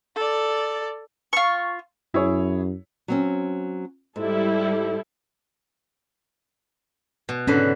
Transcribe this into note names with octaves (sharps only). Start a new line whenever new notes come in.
A4 D5
F4 C#6
F#2 E4 G#4 C#5
F#3 C4 C#4
G#2 G3 E4 A4
B2
G#2 D3 C#4 B4